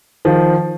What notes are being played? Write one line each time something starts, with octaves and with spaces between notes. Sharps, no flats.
D#3 F3